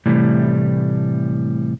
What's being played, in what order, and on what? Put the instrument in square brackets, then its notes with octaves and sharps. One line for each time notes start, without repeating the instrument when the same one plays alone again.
[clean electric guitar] A2 C3 E3 G3 A3